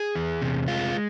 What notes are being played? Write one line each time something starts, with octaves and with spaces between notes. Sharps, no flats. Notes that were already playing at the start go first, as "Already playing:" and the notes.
Already playing: G#4
E2
C3
G#3 F4